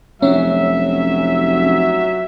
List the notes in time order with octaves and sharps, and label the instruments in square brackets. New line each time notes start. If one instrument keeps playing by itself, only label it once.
[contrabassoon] F1 [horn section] F#3 E5 [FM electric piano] C#4